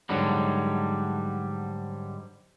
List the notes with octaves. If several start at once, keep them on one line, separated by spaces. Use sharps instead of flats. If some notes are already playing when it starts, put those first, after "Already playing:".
G#2 D3 F#3 G3